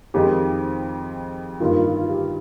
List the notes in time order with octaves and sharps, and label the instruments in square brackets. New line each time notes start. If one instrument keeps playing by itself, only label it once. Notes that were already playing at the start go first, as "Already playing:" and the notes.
[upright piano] F2 D#3 G#3 D#4 [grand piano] G4
[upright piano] G2 D#3 A#3 [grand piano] F4
[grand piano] F4
G4